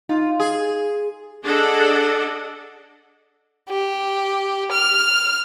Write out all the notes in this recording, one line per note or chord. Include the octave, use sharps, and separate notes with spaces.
D#4 F4
G#4
D4 G#4 A4 D#5 F#5
G4
F6